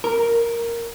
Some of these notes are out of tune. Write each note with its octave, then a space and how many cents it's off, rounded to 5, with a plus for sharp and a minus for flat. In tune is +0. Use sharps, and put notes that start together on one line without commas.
A#4 +0